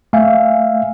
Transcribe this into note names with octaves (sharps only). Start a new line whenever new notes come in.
A3 E5 F5 G#5